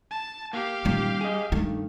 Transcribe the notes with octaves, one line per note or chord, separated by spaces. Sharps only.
A5
A#3 G4 F5
D#2 A#2 G3 C#4
G#4 D#5
G2 D#3 A3